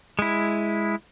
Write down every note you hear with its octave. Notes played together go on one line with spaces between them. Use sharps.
G#3 E4